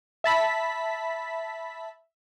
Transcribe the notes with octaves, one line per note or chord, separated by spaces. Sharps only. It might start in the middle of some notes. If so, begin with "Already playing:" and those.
E5 A5 B5 B6